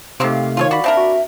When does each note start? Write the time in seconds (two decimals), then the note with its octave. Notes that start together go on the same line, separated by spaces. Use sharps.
0.20 C3 D#3 A3 A#3 C4 G4 F5
0.57 D#3 F4 A4 C#5
0.71 F#4 D5 B5
0.84 C4 D4 A#4 E5
0.97 F#4